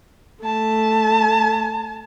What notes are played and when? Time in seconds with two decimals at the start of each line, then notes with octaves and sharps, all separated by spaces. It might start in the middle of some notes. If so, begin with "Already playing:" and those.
0.44 A3 A5